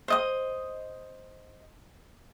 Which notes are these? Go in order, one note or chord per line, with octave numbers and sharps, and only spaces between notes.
C5 D#5 D#6